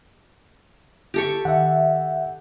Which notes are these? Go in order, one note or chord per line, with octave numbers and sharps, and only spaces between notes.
G4 A4 C#6
D#3 E5 F#5